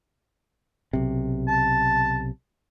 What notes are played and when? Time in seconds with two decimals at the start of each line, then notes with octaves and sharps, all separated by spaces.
0.93 B1 C3
1.48 A5